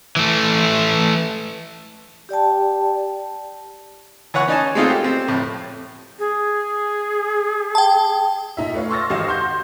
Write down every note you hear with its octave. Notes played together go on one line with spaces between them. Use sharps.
E3 A3
G4 D5 G5 A5
E3 C#5 F#5 C#6
C#4 D#4 D5 D#5 G#5 A5
G#3 B3 C4 D#4 F4 A4
G4
C4
F2 A2
G#4
G5 A5
A#2 D#4 E5
A3 B4 C#5 F5
C6 C#6 E6 F6 A6 A#6
G#1 F#3 G4 D#5 F5 E7
F#5 C6 G6